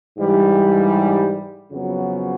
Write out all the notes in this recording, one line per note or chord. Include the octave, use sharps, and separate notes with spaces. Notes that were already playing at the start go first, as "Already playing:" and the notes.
G#2 E3 G3
F2 C#3 F#3 B3